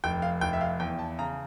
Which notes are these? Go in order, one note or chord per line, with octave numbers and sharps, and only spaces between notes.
F1 G5
F5
F1 G5
E5
F5
E2 G5
A5
C#3 A#5